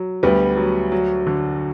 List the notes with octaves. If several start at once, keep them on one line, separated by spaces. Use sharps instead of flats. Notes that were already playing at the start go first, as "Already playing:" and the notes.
Already playing: F#3
D2 G3 B3
F#3
F#3
D3